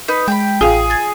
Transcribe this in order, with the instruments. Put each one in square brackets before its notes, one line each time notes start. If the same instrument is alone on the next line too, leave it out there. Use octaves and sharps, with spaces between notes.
[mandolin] D#4 B4
[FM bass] G#3 [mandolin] G5 A5 B5
[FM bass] A1 [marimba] F4 F5 [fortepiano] G#4
[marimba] G#6 A6